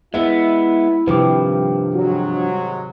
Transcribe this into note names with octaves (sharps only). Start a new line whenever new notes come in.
G#3 B3 E4 E5
G2 C3 D#3 F3 G4 B4 D6
G#2 F#3 F#4